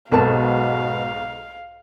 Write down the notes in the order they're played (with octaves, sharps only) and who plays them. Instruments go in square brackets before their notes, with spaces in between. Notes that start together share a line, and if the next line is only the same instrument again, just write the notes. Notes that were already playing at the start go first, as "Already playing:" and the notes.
[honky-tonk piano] B1 G#2 [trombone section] B2 [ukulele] A4 A#4 A5 [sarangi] F5